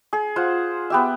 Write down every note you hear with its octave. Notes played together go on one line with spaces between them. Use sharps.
G#4
F4 C5 F#5
B3 G4 E5